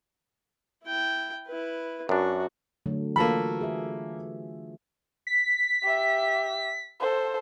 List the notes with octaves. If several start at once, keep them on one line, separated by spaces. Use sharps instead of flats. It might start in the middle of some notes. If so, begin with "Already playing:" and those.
E4 G5
E4 B4
F#2 D4 F#4
D3 F#3 A3
E3 A#3 F4 F#4 A4 B5
G#4 E5
B6
G4 E5
A4 C5